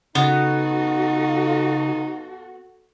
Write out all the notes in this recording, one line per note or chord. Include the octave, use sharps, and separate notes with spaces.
C#3 B3 D#4 F#4 A4